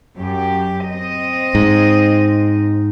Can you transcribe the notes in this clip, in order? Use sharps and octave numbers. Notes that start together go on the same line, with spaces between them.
F#2 G4
C4 D#5
G#2